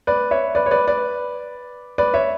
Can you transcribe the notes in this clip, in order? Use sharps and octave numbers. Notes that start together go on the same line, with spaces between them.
B4 D5
C#5 E5
B4 D5
C#5
B4 D5
B4 D5
B4 D5
C#5 E5